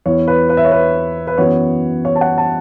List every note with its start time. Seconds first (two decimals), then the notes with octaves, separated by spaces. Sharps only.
0.06 E2 E3 B3 E4 C#5
0.28 B4
0.49 B4
0.57 E5
0.65 C#5
0.72 B4
1.27 B4
1.38 F#2 E3 B3 C#5
2.05 C#5
2.16 A5
2.21 F#5
2.38 A5